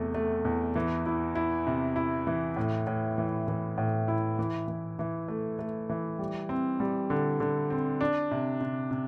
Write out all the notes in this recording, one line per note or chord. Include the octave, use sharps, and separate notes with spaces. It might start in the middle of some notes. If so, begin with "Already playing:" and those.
Already playing: E2 C3 A3
A3
E2
E3
E4
E4
C3
E4
E3
A2
A2
E3
E3
A2
E4
E3
E3
E3
A3
A3
E3
G3
C4
G3
D3
D3
C4
D4
C3
C3
C3